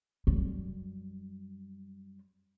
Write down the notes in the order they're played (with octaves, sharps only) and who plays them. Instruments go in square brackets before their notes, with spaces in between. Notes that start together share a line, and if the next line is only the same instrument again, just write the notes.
[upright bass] F#2 G3